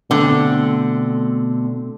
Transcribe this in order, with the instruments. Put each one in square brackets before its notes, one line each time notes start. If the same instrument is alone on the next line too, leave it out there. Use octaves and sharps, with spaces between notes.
[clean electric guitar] B2 A3 C4 [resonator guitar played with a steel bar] D3